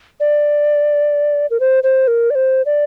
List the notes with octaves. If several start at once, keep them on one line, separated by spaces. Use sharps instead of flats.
D5
A#4
C5
C5
A#4
D5
C5
D5